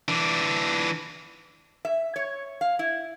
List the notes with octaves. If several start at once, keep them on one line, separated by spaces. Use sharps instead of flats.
E3 D4
E5
C#5
F5
E4